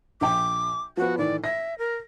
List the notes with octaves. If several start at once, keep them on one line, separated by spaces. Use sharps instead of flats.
A#1 G5 D6
F3 B3 F#4
A2 D#3 E3 D5
E5 A#6
A#4